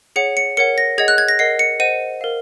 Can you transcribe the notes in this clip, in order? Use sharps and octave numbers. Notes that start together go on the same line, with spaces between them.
G#4 C#5 F#5 C#7
C#7
A#4 C#5 F#5 C#7
A#6
G#4 D#5 F#5 G#6
F#6
G#6
A#6
A#4 D#5 F#5 C7
C#7
C5 D#5 F#5 D#7
A#4 F5